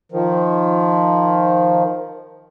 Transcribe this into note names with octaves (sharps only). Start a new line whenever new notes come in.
D#3 F3